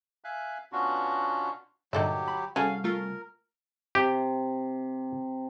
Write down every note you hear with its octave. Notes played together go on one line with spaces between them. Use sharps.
E5 F5 G#5 F#6
B2 B3 C#4 D4 F4 F#4
G2 A#2 D3 F#3 D#4 G4 A4 E5
B5
C2 C#4 F#4 G#4 A4 F5 G#5
A3 F4 A#4
C3 G4